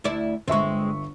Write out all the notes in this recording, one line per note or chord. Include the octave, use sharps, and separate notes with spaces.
D2 E4 D5
G1 G#3 C4 E5 C#6